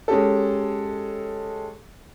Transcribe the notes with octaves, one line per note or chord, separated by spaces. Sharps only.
G#3 C#4 G4 A4